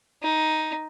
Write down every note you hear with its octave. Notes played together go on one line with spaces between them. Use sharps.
D#4